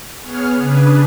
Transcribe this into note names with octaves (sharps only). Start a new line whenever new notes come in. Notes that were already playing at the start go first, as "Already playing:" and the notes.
B3 G#4 C#5 F6
C#3 D4 G#4 B4